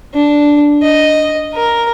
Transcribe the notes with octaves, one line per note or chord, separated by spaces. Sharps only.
D4
D#5
A#4